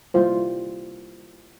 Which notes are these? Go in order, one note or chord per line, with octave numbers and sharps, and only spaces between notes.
G3 A#3 E4 F4 C5